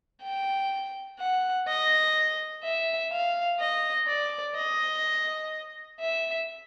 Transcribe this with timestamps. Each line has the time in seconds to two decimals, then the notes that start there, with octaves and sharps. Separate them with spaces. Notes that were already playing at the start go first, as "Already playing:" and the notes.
0.23 G5
1.19 F#5
1.68 D#5
2.64 E5
3.11 F5
3.60 D#5
4.07 D5
4.56 D#5
6.00 E5